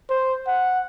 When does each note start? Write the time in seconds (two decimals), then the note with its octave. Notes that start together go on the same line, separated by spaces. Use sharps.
0.10 C5
0.47 F#5